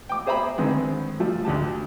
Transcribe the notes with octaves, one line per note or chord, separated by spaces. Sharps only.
G5 D6
G#4 C5 E5 A#5 B5
D3 D#3 G#3 B3 C4
F3 G3 A3
D2 D3 G4 A5